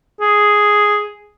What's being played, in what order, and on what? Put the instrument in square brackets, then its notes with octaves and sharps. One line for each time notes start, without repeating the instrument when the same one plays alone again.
[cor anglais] G#4